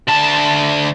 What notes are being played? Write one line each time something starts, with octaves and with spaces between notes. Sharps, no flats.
D2 A5